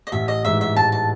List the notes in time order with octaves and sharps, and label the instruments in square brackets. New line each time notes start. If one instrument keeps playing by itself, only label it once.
[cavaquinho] D#5
[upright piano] A1 [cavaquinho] E5
[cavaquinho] D#5
[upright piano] G#2 E3 [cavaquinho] E5
[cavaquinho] E5
[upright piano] A1 [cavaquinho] A5
[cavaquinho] A5